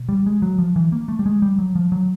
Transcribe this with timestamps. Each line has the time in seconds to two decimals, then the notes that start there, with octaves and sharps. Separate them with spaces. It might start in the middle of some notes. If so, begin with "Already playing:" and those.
Already playing: B2
0.09 G3
0.26 G#3
0.42 F#3
0.58 F3
0.76 E3
0.92 A#3
1.08 A3
1.19 G3
1.26 G#3
1.42 G3
1.59 F#3
1.75 F3
1.92 F#3